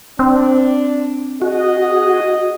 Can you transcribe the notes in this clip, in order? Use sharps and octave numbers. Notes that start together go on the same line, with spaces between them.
C4 D4
F#4 G#4 D#5